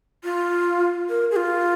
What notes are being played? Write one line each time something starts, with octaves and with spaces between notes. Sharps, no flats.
F4
A#4
G#4
F4